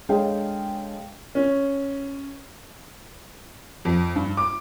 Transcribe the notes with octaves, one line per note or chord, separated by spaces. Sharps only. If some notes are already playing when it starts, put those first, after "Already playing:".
G#3 D4 A4 C#5 F5 G5
C#4
F2
G2
D6